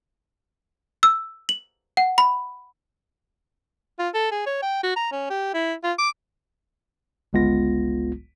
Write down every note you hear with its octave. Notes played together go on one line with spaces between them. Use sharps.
E6
F#7
F#5
B5
F4
A4
G#4
C#5
G5
F#4
A#5
C#4
G4
E4
F4
D6
G1 C#2 G#3 B3 F4 A#6